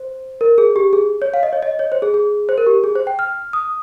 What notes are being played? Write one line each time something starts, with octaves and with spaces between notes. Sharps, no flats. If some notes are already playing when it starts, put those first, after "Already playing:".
Already playing: C5
A#4
G#4
G4
G#4
C#5
F5
D#5
C#5
D#5
C#5
C5
G#4
G#4
C5
A#4
G4
G#4
C5
G5
F6
D#6